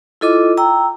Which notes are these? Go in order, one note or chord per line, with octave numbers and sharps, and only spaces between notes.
E4 F4 A4 D#5 D6
G5 A#5 E6